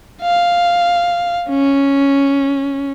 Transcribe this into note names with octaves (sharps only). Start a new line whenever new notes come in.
F5
C#4